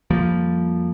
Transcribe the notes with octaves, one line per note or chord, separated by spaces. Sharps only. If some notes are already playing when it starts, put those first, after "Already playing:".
F2 F3 G3 A#3